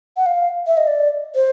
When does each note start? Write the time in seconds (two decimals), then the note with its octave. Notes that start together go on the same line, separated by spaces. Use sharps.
0.17 F#5
0.26 F5
0.67 E5
0.77 D#5
0.87 D5
1.35 C5